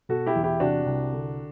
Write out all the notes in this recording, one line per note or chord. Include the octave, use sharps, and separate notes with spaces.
B2 F#4 A4
E4 G4
E2
E4 G4
C3 D4 F#4
C2
D3